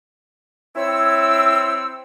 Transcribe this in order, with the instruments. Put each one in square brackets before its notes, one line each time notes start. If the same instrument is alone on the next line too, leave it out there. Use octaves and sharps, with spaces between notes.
[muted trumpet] C4 [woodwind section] E4 C#5 E6